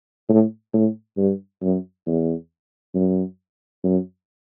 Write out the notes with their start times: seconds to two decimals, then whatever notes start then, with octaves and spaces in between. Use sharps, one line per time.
0.29 A2
0.73 A2
1.17 G2
1.62 F#2
2.07 E2
2.95 F#2
3.84 F#2